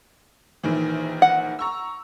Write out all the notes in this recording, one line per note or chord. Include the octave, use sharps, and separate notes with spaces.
A#1 D#3 E3
F#5
A#5 C#6 E6